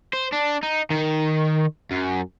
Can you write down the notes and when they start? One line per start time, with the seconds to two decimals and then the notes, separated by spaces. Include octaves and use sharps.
0.13 C5
0.32 D4
0.63 D#4
0.90 D#3
1.91 F#2